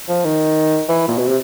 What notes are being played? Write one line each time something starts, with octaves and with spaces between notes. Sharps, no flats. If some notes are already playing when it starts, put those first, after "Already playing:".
F3
D#3
E3
A#2
B2
C3